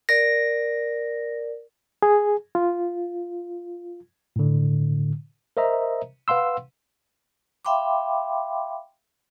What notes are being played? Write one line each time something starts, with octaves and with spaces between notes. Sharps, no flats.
A#4 D5 A#6
G#4
F4
A2 D3
A#4 C5 D#5 E5 A#5
B4 F5 F#5 C6 E6
E5 F5 G5 B5 C6 D6